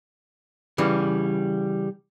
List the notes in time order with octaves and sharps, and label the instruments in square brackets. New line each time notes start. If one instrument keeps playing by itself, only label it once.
[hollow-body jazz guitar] C#3 E3 G3